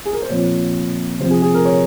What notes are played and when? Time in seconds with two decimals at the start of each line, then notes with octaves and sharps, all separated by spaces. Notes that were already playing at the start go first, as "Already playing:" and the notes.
0.06 G#4
0.13 A#4
0.22 C5
0.29 A#2 F3 C4 C#5
1.20 C3 F3 C4 C5
1.31 G#4
1.42 G#4
1.54 A#4
1.65 C#5